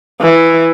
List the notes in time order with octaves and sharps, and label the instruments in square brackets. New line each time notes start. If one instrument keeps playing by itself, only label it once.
[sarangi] E3